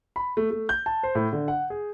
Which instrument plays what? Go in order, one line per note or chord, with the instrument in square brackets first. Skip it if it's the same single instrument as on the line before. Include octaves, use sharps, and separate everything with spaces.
[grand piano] B5
A3
A3
G6
A5
C5
A2
D3
F#5
G#4